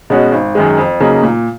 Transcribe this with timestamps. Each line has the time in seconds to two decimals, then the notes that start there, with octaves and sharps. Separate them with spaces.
0.10 B2 G#3 C#4 F#4
0.32 G#1
0.55 F#2 D#3 G#3
0.78 F2
1.00 C#3 F#3 A#3 D#4
1.23 A#2